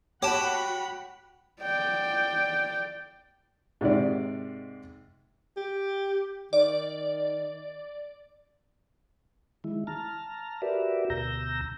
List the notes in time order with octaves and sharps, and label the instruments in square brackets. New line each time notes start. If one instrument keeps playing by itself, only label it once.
[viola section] F#4 F#5 B5 [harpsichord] G4 [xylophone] C#5 A5
[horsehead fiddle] D5 G5
[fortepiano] G#2 C3 D#3 D5
[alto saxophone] G4
[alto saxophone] D#3 [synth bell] D5
[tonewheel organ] D#3 G#3 E4
A5 A#5 F6
F#4 G4 A#4 B4 D5 E5
D2 B2 A#5 E6 G6 A#6